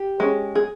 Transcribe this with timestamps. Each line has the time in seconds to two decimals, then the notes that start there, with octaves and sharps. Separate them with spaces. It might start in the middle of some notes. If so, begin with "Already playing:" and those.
Already playing: G4
0.20 G#3 C#4
0.55 G#4